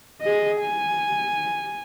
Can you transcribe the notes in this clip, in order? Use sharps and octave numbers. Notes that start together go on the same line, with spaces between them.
G#4 D#5
G#5